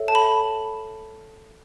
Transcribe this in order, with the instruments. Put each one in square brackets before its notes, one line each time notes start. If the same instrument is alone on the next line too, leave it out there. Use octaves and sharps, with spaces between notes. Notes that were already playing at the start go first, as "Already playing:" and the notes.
Already playing: [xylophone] A4 C#5 E5
A5
B5